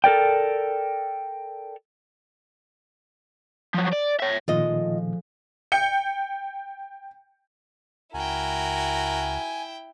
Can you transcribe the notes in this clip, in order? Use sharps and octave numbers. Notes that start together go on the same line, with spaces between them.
A4 A#4 D5 G5
F3 F#3
D5
C#5 E5
A#2 D#3 F3 G#3 A3 F4 D#5
G5 G6 C#7
C#2 E4 F#4 A#4 G5 G#5